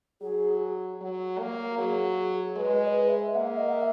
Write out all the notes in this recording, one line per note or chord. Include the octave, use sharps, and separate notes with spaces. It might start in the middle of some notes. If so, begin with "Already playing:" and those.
F#3 G#4
F#3
A#3
F#3 G#4
G#3 B4
D#5
B4
E5
A#3 F#5
E5
D#5
F#5
E5